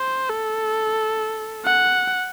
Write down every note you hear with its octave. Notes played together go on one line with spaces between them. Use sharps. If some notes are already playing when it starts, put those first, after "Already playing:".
Already playing: C5
A4
F#5